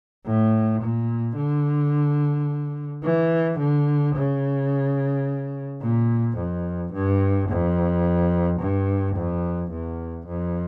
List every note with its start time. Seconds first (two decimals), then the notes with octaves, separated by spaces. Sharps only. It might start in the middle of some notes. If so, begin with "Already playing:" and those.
0.25 A2
0.81 A#2
1.36 D3
3.04 E3
3.59 D3
4.15 C#3
5.82 A#2
6.38 F2
6.93 G2
7.49 F2
8.59 G2
9.16 F2
9.71 E2
10.27 F2